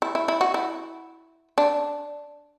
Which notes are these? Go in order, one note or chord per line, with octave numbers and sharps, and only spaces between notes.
E4
E4
E4
F#4
E4
D4